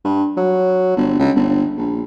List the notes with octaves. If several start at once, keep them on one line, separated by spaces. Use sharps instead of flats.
G2
F#3
G1
C#2
G1
A#1